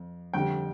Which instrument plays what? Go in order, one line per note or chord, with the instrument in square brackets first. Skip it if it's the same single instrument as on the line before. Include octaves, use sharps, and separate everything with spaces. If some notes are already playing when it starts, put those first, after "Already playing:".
Already playing: [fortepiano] F2
F2 D3 G3 G5